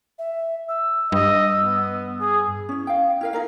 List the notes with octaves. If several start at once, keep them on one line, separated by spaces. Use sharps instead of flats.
E5
E6
G2 D#5
B3
G#4 D#6
C#4 E4
F5 G5
E4 A#4 F5
D#4 F4 A#4 F5